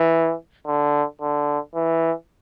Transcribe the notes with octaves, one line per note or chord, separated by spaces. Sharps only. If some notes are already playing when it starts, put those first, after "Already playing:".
Already playing: E3
D3
D3
E3